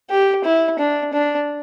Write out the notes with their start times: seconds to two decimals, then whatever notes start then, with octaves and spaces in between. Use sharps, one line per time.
0.10 G4
0.44 E4
0.79 D4
1.13 D4